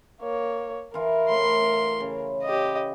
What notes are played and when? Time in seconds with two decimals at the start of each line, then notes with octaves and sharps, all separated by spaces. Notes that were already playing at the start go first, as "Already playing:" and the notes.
0.21 A#3 C#5
0.94 E3 F4 A#4
1.29 A2 B5 C6
2.00 C#3
2.43 G4 D#5